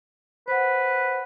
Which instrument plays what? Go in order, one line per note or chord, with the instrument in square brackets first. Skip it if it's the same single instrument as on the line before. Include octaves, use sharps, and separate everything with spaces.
[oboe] B4 [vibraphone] C5 F#5